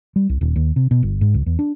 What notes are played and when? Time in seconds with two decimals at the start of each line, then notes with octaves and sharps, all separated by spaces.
0.16 G3
0.29 C2
0.41 D#1
0.56 D#2
0.76 C3
0.91 B2
1.03 G1
1.21 G#2
1.34 C#2
1.46 E2
1.59 D4